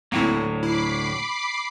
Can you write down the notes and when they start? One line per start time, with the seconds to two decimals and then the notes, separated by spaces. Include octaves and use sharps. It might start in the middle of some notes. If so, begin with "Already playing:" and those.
0.12 D2 A2 F#3 A#3 C4 E4
0.63 E4 B5 D6 C7